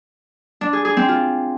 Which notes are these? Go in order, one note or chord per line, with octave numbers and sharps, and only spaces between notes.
D4
G#4
G#4
C4
F4